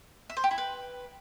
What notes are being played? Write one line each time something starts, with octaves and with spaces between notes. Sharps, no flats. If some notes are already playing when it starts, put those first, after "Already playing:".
E5
C5
G4
E4
B4